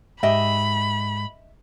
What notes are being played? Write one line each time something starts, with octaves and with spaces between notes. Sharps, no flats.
G#2 G4 D#5 E5 B5